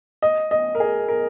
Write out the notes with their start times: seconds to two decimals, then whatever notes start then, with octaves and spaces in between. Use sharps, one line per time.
0.22 D#5
0.51 D#5
0.75 A#4
0.80 G#4
1.08 A#4